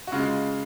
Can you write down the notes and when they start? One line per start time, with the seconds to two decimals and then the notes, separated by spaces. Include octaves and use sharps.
0.07 F#4
0.12 C#3 G#3 F4